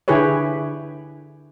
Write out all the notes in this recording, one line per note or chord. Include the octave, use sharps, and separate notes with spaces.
D3 E4 G4 G#4 B4 C#5